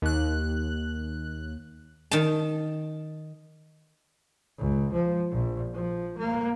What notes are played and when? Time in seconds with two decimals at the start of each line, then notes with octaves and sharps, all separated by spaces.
0.02 D#2 F#6
2.11 D#3 A5
4.59 C#2
4.93 F3
5.32 A#1
5.74 F3
6.18 A#3